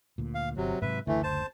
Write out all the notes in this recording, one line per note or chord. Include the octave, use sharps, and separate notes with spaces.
D2 A#2
F5
G1 C3 F#3
G#2 C3 F#3 B4 E5
F#1 D2 D3 E3 A3
C5 A5